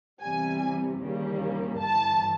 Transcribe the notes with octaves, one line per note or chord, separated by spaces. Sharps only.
E2 C3 E3 G3 G#5
D#2 C#3 E3 G3 A#3
G1 G2 E3 A5